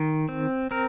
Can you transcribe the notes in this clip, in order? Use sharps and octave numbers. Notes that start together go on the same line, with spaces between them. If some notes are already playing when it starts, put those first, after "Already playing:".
Already playing: D#3
C4
C4 A#4